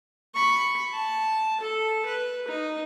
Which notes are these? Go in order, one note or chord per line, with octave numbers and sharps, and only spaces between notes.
B5 C#6
A5
A4
B4
D#4